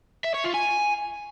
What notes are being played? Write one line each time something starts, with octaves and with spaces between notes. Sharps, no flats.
E5
C#5
F4
G#5